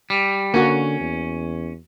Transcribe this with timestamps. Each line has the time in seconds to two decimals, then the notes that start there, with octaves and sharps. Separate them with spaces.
0.10 G3
0.54 D3 A#3 C#4 F#4
1.00 E2